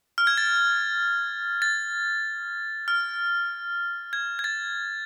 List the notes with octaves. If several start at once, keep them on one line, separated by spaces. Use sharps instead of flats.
F6
G#6
A6
A6
F6
G#6
G#6
A6